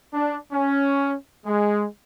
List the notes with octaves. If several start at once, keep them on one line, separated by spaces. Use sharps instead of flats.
D4
C#4
G#3